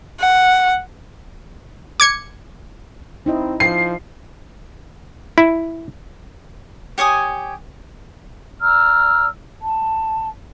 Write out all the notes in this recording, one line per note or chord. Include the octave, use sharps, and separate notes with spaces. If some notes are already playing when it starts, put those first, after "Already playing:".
F#5
D6 G#6 C#7
C4 D#4 E4 D#5
F3 C7
E4
G4 C#5 G#5 D#6
D5 A#5 E6 F6
A5